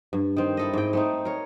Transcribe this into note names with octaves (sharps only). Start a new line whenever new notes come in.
G2
D#3 C4
E4 A4 D#5
G#2 G5
A3 C4 D#4
A#4 C#5